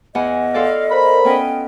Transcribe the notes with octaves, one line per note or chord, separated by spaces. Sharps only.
E2 D#5 F#5 G#5
F4 A4 D5 F5
A#4 C5 B5
B3 C#4 D#5 G5